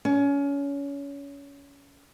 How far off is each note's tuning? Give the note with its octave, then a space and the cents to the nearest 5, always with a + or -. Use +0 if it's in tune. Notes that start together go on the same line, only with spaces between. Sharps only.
C#4 +25